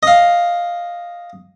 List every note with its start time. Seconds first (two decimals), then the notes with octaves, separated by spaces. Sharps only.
0.03 D#5 F5